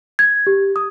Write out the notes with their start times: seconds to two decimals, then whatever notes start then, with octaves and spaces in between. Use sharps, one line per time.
0.19 G#6
0.47 G4
0.76 D#6